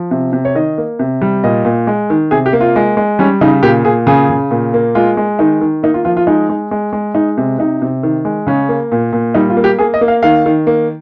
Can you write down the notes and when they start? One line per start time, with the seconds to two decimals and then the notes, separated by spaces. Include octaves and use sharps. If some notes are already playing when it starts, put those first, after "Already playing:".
Already playing: F3
0.11 C3
0.33 C3
0.45 C#5
0.55 D#3 D#5
0.78 A#3
0.99 C3
1.21 G3
1.44 A#2 D#5
1.65 A#2
1.87 G#3
2.10 D#3
2.31 C3 G#4
2.46 G4
2.53 A#3
2.61 F4
2.76 G#3
2.97 G#3
3.19 G3 C#4
3.41 C#3 D#4
3.63 A#2 G4
3.85 A#2 G#4
4.07 C#3 G#4
4.29 C#3
4.51 A#2
4.74 A#3
4.95 G#3 F4
5.17 G#3
5.39 D#3 D#4
5.61 D#3
5.83 A#3 D#4
5.94 F4
6.05 F3 F4
6.17 F4
6.27 G#3 D#4
6.49 G#3
6.71 G#3
6.93 G#3
7.15 G#3 D#4
7.38 C3
7.59 C3 D#4
7.82 C3
8.03 D#3
8.25 G#3
8.47 C#3 C#4
8.69 A#3
8.92 A#2
9.13 A#2
9.35 G3 D#4
9.50 F4
9.57 A#3
9.64 G4
9.79 A#3 G#4
9.94 D#5
10.01 A#3
10.08 F5
10.23 D#3 F5
10.46 D#3
10.67 A#3